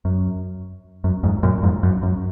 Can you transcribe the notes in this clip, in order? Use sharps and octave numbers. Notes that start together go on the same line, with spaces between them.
F#2
F#2
F2 G#2
F#2 A#2
F2 G#2
F#2
F#2